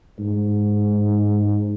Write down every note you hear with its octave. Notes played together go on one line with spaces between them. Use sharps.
G#2